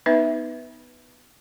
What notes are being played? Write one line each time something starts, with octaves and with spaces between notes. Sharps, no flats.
B3 D#4 B4 E5